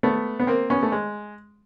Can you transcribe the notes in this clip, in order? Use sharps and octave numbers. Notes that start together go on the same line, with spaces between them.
A3 B3
B3
A#3 C4
B3 C#4
A3
G#3